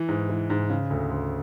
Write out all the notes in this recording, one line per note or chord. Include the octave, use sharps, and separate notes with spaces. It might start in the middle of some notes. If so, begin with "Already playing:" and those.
Already playing: E3
G#2
E3
G#2
C#3
D2
D2